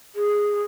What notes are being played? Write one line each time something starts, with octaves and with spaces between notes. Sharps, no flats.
G#4